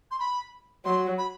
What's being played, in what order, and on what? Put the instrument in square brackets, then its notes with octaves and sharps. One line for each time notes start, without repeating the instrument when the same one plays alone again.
[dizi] C6
B5
[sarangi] F#3 [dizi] C6
[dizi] B5